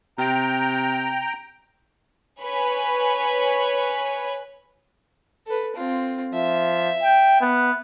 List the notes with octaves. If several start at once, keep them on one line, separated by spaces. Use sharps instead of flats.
C3 G5 A#5
B4 C#5 G#5 B5
A4 B4
C4 F4
F3 E5
G5
B3